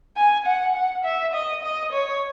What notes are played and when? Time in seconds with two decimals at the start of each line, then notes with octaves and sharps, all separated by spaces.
0.16 G#5
0.46 F#5
0.75 F#5
1.04 E5
1.33 D#5
1.63 D#5
1.92 C#5